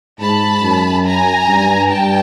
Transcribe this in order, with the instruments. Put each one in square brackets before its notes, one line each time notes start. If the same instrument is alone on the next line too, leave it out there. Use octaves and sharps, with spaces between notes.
[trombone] G#2 [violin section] A5 B5
[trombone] F#2
[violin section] G#5 A#5
[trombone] G2
[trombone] G2 [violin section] G5 A5